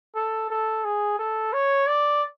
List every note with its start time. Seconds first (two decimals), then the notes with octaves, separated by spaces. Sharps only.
0.15 A4
0.50 A4
0.84 G#4
1.19 A4
1.53 C#5
1.87 D5